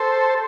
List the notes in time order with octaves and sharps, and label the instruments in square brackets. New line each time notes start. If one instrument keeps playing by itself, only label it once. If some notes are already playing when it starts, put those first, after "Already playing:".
Already playing: [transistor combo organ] A4 C5